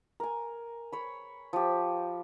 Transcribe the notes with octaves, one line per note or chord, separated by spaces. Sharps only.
A#4 G#5
C#5 B5
F3 G4